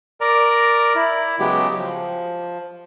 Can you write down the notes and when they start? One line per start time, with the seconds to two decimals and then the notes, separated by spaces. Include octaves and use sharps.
0.21 A#4 D5 A#5
0.96 E4
1.40 C#3 F#3 G#3 B3 G4
1.79 F3